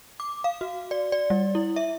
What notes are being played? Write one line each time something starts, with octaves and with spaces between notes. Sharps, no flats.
D6
F5
F#4
D5
D5
G3
E4
E5